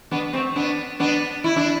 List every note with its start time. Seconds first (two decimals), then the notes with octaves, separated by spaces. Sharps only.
0.11 B3 D4
0.33 A3 C4
0.56 B3 D4
1.00 B3 D4
1.44 E4
1.56 D4